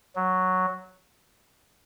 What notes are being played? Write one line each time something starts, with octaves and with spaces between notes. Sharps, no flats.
F#3